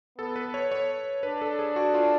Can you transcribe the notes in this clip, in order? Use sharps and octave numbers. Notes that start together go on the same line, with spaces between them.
B3 A4
B4
C#5
C#5
D4 B4
A4
G#4
F#4
F4